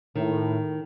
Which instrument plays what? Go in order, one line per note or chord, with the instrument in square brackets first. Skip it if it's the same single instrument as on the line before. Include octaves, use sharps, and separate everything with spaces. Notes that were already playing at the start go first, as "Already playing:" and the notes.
[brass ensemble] A2 [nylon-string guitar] D#3